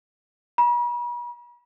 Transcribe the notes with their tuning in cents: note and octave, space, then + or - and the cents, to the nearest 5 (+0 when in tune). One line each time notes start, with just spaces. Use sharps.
B5 -45